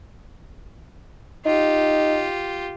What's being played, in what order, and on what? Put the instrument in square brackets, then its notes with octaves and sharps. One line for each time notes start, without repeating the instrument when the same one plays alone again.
[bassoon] D#4 [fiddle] F4 G4